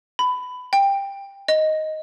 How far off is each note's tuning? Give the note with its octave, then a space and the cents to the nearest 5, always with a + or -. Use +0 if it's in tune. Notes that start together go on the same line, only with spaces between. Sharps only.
B5 +20
G5 +15
D#5 +5